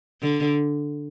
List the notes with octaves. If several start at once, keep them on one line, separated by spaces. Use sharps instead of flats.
D3